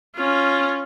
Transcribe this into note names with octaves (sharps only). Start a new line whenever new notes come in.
C#4 F4